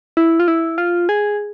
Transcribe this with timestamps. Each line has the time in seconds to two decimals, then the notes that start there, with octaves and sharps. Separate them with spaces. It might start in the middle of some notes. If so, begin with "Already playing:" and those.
0.17 E4
0.40 F4
0.48 E4
0.78 F4
1.09 G#4